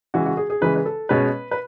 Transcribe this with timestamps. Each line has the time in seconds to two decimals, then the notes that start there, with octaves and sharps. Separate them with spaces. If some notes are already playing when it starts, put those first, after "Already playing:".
0.14 C#3 E3 G#3 F#4
0.26 F#4
0.37 G#4
0.50 G#4
0.61 C#3 E3 G#3 B4
0.76 B4
0.86 A4
1.09 B2 G#3 C#4 B4
1.51 B4